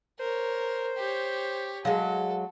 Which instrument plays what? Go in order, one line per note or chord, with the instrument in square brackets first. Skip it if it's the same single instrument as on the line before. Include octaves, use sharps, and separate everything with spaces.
[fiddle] A#4 C#5 [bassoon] C5
[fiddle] G4 C#5
[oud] F#3 G#3 [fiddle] A4 [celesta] F5